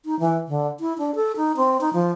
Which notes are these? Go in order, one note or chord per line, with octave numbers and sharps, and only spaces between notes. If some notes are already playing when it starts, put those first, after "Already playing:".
D#4
E3
D3
E4
D4
A4
D#4
C4
D#4
F3